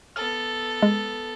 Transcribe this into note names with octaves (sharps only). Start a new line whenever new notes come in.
B3 A4 F6
G#3